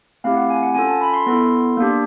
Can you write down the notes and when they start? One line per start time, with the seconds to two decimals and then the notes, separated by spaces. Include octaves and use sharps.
0.24 A3 C4 E4 G4 F5
0.36 F#5
0.50 G#5
0.63 F#5
0.74 C#4 F4 A4 G#5
0.88 A5
1.01 B5
1.13 C6
1.26 B3 E4 A4
1.77 A#3 D4 G4